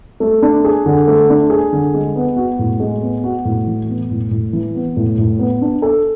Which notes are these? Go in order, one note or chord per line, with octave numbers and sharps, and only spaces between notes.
A3
D4
G#4
D3
A3
D4
G#4
D3
G#3
B3
F#4
A2
G#3
B3
F#4
A2
E3
B3
A2
A2
E3
B3
A2
A2
B3
D4
A4